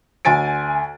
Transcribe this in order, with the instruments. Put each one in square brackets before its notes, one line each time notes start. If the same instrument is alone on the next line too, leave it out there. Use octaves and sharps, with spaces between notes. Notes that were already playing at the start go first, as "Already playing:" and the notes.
[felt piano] D2 G#5 A6 D7